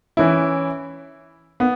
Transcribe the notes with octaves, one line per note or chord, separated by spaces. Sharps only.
E3 C#4 E4
B3